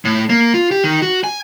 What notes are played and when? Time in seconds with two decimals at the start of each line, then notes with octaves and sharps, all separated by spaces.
0.05 A2
0.30 A#3
0.54 F4
0.71 G4
0.84 D#3
1.02 F#4
1.24 G#5